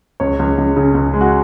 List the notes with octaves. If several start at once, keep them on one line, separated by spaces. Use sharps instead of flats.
C#2 C#5
C#2
C#2
C#3
C#2
G#3
F#4